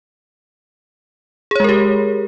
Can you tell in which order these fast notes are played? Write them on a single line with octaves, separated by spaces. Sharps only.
G#4 C#5 G#3 A#4 G4